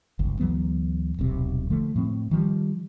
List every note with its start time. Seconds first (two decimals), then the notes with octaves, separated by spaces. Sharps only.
0.19 G1 C#2
0.40 D2 E3 F#3 B3
1.19 D#1 B1 C3
1.70 D3 F3 A3
1.96 A2 F3 C4
2.31 D#3 F3 G3